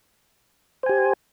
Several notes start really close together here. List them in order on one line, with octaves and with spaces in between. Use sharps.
C5 G#5 G4